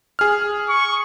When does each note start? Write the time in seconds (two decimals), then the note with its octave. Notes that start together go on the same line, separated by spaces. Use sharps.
0.19 G#4 F6
0.69 C#6